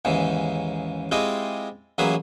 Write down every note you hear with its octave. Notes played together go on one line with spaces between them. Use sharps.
D#2 G#2 C#3 E3
G#3 C4 E4 F4 G4 D#5
A1 F#3 A#3 G#4 B4 E5